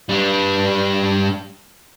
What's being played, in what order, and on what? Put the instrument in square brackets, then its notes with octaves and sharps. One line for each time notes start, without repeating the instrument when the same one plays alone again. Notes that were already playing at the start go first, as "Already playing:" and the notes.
[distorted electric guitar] G3 D4